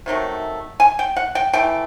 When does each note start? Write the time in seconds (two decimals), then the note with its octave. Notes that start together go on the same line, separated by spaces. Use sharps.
0.06 C3 D#3 F#3 A3
0.80 G#5
0.99 G5
1.16 F#5
1.35 G5
1.53 E3 A3 G5